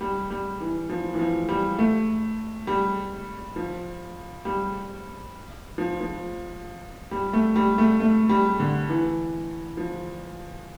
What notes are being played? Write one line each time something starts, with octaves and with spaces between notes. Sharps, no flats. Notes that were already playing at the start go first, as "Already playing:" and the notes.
G3
G3
E3
F3
E3
F3
G3
A3
G3
F3
G3
F3
F3
G3
A3
G3
A3
A3
G3
D3
E3
F3